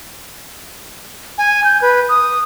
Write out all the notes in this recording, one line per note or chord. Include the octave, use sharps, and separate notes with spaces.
G#5
G6
B4
D#6